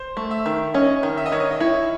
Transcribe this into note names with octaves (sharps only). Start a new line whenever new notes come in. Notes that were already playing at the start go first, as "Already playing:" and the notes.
Already playing: C5
A3
E5
D#3
C#4 D#5
D#3
E5
D#5
D#3 C#5
D#5
D#5
E4 C#5